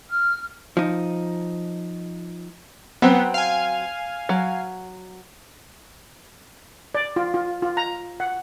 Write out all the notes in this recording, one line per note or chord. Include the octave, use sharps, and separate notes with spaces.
F6
F3 D#4
F#3 B3 C4
F5 G#5
F#3
D5
F4
F4
F4
A#5
F#5